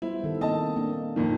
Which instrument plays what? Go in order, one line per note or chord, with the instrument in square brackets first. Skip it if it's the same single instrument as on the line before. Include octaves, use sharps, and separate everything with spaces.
[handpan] G3 B3 C5 [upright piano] E4
[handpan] D#3 A4
[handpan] A#3 C4 [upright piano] D#5 A5
[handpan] A#3 D4
[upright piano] F2 A#2 D#3 [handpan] C4 F4